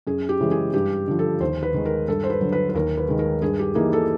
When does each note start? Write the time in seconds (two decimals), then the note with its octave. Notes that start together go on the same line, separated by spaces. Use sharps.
0.07 F#2 G#4
0.29 G4
0.40 C#3 E3 G#3 C#4
0.51 G#4
0.73 G2 G4
1.08 D3 F3
1.19 A4
1.40 D#2 C5
1.63 B4
1.74 D#3 G#3
1.85 A#4
2.08 G2 A4
2.24 C5
2.30 B4
2.41 D3 F#3
2.52 B4
2.69 B4
2.75 D#2 A#4
2.97 B4
3.08 D#3 G#3
3.19 A#4
3.42 G2 G#4
3.59 G4
3.75 E3 G3 A#3 D#4 G#4
3.93 A4